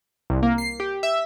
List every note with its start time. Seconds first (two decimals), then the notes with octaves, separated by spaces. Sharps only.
0.30 C2
0.43 A#3
0.58 C7
0.80 G4
1.03 E5